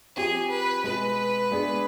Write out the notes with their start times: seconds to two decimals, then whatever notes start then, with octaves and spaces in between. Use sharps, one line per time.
0.16 F3 C4 G4 G#4
0.50 B4
0.84 B2 G#3 B3 B4
1.51 G#3 B3 D4 G#4